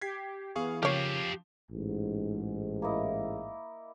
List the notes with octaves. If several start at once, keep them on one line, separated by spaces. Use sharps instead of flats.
G4 G#6 B6 C7
E3 B3 G#4 F5 C#6
C#3 F3 A#3 G4 C#5 F5
A1 G#2
A#3 E4 D#5